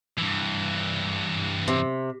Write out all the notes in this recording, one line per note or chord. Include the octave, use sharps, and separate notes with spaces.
G2 E3
C3